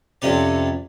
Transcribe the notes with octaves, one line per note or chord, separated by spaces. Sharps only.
F2 C3 C#4 D5